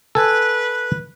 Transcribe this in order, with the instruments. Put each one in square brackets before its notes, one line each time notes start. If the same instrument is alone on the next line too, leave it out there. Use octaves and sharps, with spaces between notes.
[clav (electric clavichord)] A4 G#5 [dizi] B4